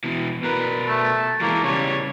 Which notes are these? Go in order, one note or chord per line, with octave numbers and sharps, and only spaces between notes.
B2 E3
B2 A#4 B4
A3
E3 G#3 A#3
C#3 G3 C#5